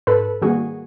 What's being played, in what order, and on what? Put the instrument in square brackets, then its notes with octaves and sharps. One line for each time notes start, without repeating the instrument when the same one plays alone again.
[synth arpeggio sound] G#2 A4 B4
D#3 G3 A#3 F#4 G#4